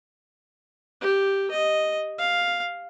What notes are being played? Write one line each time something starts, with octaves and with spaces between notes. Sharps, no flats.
G4
D#5
F5